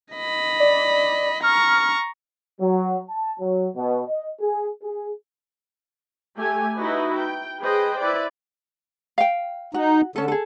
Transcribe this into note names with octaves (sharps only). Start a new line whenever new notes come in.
D#5 B5
D5
A#5 C#6 F6
F#3
A5
F#3
B2
D#5
G#4
G#4
A3 G4 G#5
D#4 E4 F#4 B4 D#5
G5
G#4 B4 C5 D#5 G5
E4 B4 D5
F5 G5
D#4 F#4
D3 C#4 A4
G#4 A4